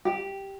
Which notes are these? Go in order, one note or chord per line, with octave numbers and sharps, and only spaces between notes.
G4